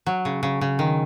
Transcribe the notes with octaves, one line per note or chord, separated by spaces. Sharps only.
F#3
C#3
C#3
C#3
D#3